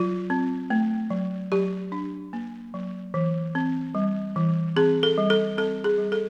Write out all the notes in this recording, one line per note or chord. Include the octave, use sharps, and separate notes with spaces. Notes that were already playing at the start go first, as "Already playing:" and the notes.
Already playing: F#3 F4
C4
A3
F#3
F#3 G4
D4
A#3
F#3
E3
C4
G3
E3
C4 G#4
A4
G3
A4
C4 A4
G#4
G3
A4